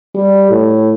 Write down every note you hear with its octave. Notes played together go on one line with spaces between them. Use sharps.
G3
A2